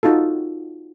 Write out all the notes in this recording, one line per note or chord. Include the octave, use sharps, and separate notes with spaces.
D#4 F4 F#4 A4